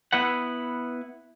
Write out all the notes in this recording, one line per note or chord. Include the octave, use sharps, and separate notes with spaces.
B3 E4 B4 F#5